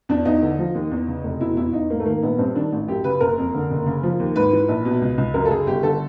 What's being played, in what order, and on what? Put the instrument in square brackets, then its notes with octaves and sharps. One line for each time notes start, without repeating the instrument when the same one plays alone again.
[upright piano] E2 D4
E2 D#4
D3
F3
D#2
E2
C#3
F1
B2 E4
E2 E4
E2 D#4
G#2 A#3
A3
D#3 A#3
A#1 B3
G2 C4
D#3 D4
A1
F#2 G4
C#3 B4
F#1 A#4
F2
D3
F#1
C#3
F3
D#2
G#2 B4
E3
A#1
B2
C#2
C#2
F#2 A#4
A4
C#3 G#4
G1 G4
D3 A4